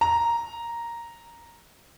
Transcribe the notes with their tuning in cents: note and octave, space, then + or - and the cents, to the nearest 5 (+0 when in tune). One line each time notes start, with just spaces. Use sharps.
A#5 +0